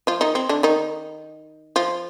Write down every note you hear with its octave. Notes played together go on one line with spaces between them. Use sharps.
F3 F4
D#3 D#4
C4
D3 D4
D#3 D#4
F3 F4